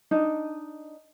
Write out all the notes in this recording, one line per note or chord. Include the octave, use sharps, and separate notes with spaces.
D4 D#4 D#5